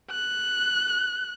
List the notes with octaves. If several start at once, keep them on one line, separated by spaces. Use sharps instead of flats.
F#6